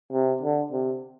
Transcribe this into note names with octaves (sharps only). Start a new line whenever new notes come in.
C3
D3
C3